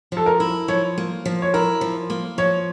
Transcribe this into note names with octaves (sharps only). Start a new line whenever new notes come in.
F3 A4
A#4
E4
F3 C#5
A#3
F3
C#5
E4 A#4
F3
A#3
F3 C#5